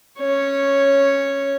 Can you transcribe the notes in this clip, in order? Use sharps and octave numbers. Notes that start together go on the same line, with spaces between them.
C#4 C#5